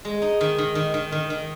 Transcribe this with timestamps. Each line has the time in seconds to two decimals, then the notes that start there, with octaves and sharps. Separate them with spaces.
0.05 G#3
0.22 D#4
0.41 D#3
0.58 D#3
0.75 D#3
0.94 D#3
1.12 D#3
1.30 D#3